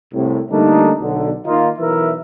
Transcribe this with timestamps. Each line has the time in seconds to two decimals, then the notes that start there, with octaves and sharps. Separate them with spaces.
0.14 C2 A2
0.52 D3 G3 A3 A#3 D4 D#4
1.01 B1 D3
1.46 D#3 A#3 D#4 F4
1.79 B1 E3 A#4 B4 E5